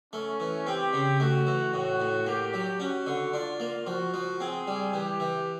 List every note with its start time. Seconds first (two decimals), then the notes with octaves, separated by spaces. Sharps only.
0.13 A3 C#4
0.40 E3
0.67 C4 G4
0.93 C#3
1.19 A3 F#4
1.47 E3
1.74 A2 F#4
2.00 A2
2.26 A#3 G4
2.54 F#3
2.80 C#4 F#4
3.07 D3
3.33 D4 F4
3.60 A#3
3.87 F3 F#4
4.14 F3
4.40 C4 G#4
4.67 G3
4.93 E3 G4
5.20 E3